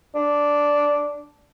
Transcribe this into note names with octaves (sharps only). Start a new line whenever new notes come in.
D4